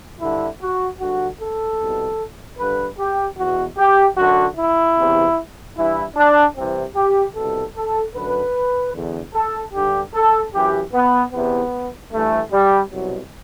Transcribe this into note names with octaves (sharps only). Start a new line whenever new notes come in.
G2 D3 E4
F#4
G2 D3 F#4
A4
C2 B2
G2 D3 B4
G4
E2 B2 F#4
G4
F#2 D3 F#4
E4
E2 C3 E3
G2 E3 E4
D4
C2 C3 E3 C4
G4
C2 B2 A4
A4
F#2 D3 B4
E2 D3
A4
G2 D3 G4
A4
F#2 E3 G4
B3
E2 C3 E3 B3
G2 E3 A3
G3
C2 B2 F#3